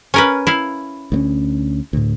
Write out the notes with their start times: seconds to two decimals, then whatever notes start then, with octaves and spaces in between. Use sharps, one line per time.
0.14 C#4 A#4 B4
0.47 E4 F5
1.12 D2 A3 C#4
1.93 D2 A2